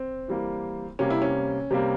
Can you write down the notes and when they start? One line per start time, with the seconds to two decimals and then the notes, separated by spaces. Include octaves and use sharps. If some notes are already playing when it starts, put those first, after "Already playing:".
Already playing: C4
0.28 E3 G3 A#3
0.99 C3 G3 A#3 C#4
1.10 E4
1.22 C#4
1.71 C3 G3 A#3